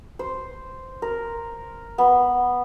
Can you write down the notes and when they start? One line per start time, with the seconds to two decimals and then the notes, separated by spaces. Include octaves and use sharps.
0.19 C5
1.02 A#4
1.98 B3